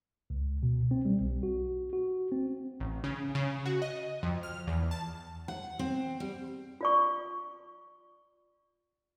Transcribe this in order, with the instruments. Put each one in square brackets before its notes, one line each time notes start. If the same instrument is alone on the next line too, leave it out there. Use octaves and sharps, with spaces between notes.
[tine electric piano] C#2
B2
C4
G3
B1
F#4
F#4
C4
[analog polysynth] A1
C#3
C#3
F#4
D#5
F2
F6
E2
A5
[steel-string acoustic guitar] F#5
C4
G3
[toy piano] F4 D5 C#6